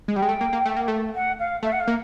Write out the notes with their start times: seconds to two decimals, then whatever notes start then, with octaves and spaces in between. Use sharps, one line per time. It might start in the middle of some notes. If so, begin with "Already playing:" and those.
0.08 G#3
0.16 G3 G5
0.22 G#3
0.29 A3
0.41 A#3
0.53 A#3
0.65 A3
0.77 A#3
0.88 A3
1.15 F#5
1.39 F5
1.63 A3 E5
1.72 F#5
1.80 F5
1.88 A#3